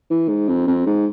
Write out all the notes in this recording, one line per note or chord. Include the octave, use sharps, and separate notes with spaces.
E3
G#2
F2
F2
G#2